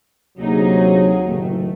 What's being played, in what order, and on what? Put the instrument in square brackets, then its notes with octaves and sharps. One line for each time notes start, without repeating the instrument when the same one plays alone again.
[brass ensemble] D2 C3 F#3 [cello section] A#3 D#4 G#4
[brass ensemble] F#1 A2 D#3 [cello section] A3